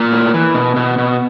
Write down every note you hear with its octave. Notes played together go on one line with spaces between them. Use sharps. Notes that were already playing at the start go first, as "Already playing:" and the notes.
Already playing: A#2 A#3
A2
E3
B2
B2
B2